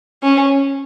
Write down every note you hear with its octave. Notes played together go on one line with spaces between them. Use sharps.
C#4